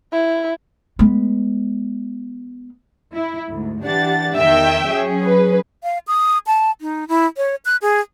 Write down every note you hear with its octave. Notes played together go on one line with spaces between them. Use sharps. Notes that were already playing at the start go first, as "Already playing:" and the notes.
E4
G#3 B3
E4
D2 G#2
E3 D4 G4 F#5 A6
E2 D#3 E5 G5
F#3 C#4 G#4
B4
F5
D#6
A5
D#4
E4
C#5
F#6
G#4